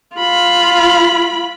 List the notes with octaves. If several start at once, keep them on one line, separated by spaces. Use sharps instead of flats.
F4 B5